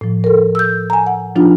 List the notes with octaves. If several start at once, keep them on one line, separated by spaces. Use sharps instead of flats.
A2 F3
A4 A#4
E6 G6
G#5 A#5
F#5
F3 D4 D#4 F4